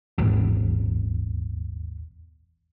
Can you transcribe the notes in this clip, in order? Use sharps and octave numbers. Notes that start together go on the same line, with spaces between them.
D#1 G#1 E2